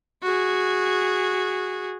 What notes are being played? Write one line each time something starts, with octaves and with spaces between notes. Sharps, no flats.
F#4 G#4